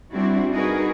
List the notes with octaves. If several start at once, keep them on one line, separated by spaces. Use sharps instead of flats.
G3 C4 D4 E4 F#4
D#4 F#4 G#4 A#4 B4